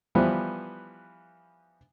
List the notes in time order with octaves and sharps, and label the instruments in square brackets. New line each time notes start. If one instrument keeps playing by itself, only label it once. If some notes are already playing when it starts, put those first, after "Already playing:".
[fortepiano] E3 F3 G3 B3